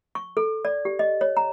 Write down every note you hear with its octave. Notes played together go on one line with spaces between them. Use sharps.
C#6
A4
D5
G4
D#5
C#5
A#5